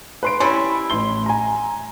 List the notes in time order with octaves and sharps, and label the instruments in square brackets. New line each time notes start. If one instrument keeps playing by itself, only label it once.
[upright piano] B4 C6 D7
[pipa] G3 C#4 E4 [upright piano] C6
[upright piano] A1 C6 G7
G#5 A#5